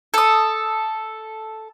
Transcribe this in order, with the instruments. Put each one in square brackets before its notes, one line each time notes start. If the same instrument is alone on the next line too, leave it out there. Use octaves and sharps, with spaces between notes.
[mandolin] A4 D#6